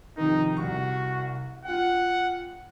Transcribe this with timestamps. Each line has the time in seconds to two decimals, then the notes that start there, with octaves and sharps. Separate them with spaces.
0.17 F2 C3 D#3 D#4
0.57 C2 F#4 C#6
1.65 F4 F#5 G5